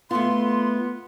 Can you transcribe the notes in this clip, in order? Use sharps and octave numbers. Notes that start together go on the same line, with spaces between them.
A3 B3 F4 C6